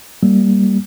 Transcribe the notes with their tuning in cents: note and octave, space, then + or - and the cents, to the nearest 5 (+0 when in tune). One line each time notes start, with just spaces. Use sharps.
G3 +0 A#3 +0